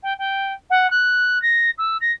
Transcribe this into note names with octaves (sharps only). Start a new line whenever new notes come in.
G5
G5
F#5
F#6
A#6
E6
A#6